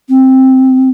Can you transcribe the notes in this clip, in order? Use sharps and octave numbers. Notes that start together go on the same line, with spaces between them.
C4